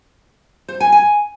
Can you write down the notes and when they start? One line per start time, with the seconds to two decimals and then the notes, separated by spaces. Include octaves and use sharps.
0.68 C5
0.80 G#5
0.92 G#5